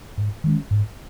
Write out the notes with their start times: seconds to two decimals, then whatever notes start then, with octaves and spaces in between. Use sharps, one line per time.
0.17 G#2
0.44 D#3 G#3 C#4
0.71 G#2